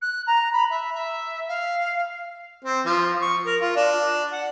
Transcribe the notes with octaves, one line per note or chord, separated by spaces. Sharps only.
F#6
A#5
B5
E5
E5
F5
C4
F3
C#6
A#4
F4
D4
F#5